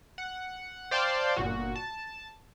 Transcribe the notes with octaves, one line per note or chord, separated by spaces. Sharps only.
F#5
C5 D5 F5 G5 A5 C6
G1 A#2 F#4
A5